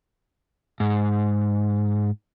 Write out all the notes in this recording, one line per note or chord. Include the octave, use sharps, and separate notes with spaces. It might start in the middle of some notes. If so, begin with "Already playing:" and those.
G#2